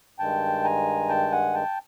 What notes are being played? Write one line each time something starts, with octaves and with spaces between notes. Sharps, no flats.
G2 D#3 G#3 G5 A5
G#5 A#5
G5 A5
F#5 G#5
G5 A5